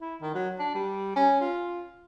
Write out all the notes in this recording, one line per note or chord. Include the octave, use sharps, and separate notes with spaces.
E4
D#3
F#3
D4
G3
C#4
F4